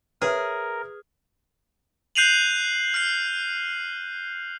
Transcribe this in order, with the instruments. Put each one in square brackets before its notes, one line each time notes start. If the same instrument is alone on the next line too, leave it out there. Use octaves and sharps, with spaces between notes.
[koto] G#4 [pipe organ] A#4 [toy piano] B4 [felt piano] C#5 E5 F6
[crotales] F#6 G6 C7 D#7 F7 F#7
F6 C7